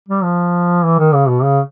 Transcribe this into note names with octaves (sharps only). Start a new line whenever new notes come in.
G3
F3
E3
D#3
C#3
B2
C#3